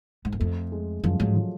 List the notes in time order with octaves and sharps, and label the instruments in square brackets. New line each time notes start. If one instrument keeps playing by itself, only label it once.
[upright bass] G#2
F#2
[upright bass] F2 [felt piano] A3
[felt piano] G#3
[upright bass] F#2 [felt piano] F3
[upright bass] G#2 [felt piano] F#3
[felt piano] F3